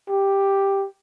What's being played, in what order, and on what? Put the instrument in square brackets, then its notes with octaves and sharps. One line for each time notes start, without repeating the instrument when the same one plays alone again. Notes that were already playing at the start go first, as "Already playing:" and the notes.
[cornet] G4